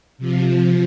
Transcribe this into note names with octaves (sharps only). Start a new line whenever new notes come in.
C3 F3